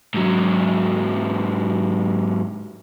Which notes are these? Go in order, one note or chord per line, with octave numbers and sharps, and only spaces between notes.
G#2 F#3